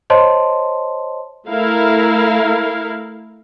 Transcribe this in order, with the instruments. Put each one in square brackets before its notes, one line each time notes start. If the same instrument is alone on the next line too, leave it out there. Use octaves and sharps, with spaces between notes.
[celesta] C5 C#5 D#5 A5 C6
[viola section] A3 E4 A#4 F5